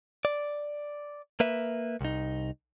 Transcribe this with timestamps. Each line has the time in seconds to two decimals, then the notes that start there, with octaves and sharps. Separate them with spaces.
0.25 D5
1.40 A#3 B4 E5
2.01 C2 D#4